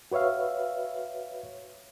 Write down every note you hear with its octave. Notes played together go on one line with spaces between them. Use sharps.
F#4 B4 C#5 E5 F5